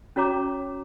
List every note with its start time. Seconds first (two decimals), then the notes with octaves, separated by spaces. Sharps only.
0.16 C#4 F#4 C#5 A#5 D6